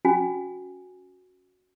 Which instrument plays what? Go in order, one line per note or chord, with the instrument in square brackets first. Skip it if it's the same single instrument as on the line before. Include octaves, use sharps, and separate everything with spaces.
[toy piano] C#4 F#4 G#5